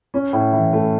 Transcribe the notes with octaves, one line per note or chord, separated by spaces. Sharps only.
C#4
A2
E3
A3